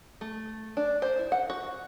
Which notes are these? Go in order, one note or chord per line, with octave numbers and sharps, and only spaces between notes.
A3
D4
C5
E4
F#5
F#4